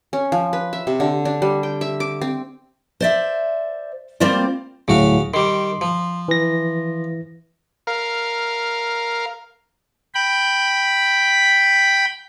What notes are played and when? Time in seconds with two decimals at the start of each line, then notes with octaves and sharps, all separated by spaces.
0.13 C#4
0.32 F3
0.53 B4
0.73 E5
0.87 C3
1.00 D3
1.25 D4
1.42 G3
1.63 G5
1.81 E5
2.00 D6
2.21 C4
3.01 C5 D5 E5
4.20 G3 A#3 C4 F4 C5 D5
4.88 D2 A2 C#3 F#3 F#4 F5
5.34 D#3 G3 C6
5.81 F3
6.28 E3 A#6
7.87 A#4 F5
10.15 G5 B5